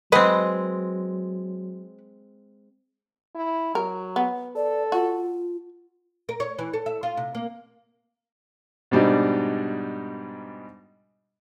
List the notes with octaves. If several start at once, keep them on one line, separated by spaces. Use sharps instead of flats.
F#3 G#3 C4 B4 D#5 F#5
E4
F#3 A#4
B3
A4 D5
F4 F#4
A#4
C#5
E3
A4
E5
F4
C3
A#3
G#2 B2 G3 D4 D#4